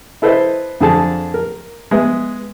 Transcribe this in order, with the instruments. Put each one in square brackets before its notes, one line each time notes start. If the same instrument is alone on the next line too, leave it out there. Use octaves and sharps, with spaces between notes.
[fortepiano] E4 A4 B4 C5 D#5 E5
F2 D3 G#4 A4 A5
A#4
G#3 B3 E5